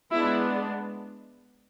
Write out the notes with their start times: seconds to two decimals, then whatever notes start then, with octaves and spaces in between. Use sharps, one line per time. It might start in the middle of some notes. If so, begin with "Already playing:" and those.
0.12 G#3 B3 D4 E4